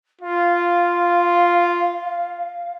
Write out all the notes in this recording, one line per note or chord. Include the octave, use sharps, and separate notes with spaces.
F4 F5